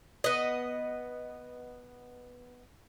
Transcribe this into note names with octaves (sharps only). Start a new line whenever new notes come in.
B3 D#5